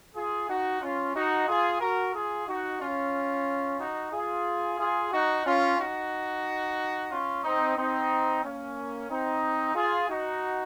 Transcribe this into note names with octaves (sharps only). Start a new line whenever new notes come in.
F4 G#4
D#4 F#4
C#4 F4
D#4 F#4
F4 G#4
F#4 A#4
F4 G#4
D#4 F#4
C#4 F4
D#4 F#4
F4 G#4
F4 G#4
D#4 F#4
C#4 F4
D#4 F#4
C#4 F4
C4 D#4
C4 D#4
A#3 C#4
C4 D#4
F4 G#4
D#4 F#4